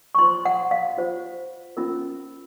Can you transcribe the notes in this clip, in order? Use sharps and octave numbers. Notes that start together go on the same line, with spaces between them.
C#6
F4 C5 C6
F#5
F5
F4 C5
C#4 F4 A#4